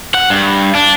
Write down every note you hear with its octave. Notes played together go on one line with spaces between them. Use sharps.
F#5
G2
D4